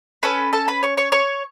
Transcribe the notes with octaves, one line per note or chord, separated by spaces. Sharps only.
C#4 A4 B4 B5
A4 A5
B4 B5
C#5 C#6
C#5 C#6
C#5 C#6